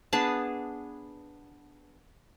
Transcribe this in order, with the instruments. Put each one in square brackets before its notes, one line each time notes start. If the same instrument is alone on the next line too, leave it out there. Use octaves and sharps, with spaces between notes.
[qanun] B3 D4 G#4 A5